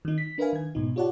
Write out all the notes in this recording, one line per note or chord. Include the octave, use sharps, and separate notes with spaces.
D#3 D#4
B6
D4 A#4 B4 E5 F5 G#5
D#3 G#6
G#2 B2 D#4
F4 G4 C#5 D5 F#5 A5